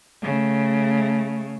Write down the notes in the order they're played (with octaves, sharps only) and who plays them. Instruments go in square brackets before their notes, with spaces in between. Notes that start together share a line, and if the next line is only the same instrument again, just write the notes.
[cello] C#3 A3